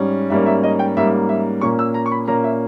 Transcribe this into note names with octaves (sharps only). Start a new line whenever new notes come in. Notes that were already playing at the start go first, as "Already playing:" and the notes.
Already playing: G#2 G3 C#4
G#2 G3 A#3 C#4 E5
E5
D#5
G5
G#2 G3 A#3 C#4 E5
E5
A#2 A#3 C#4 C#6
E6
A#5
C#6
B5
A#2 A#3 C#4 A#5
E5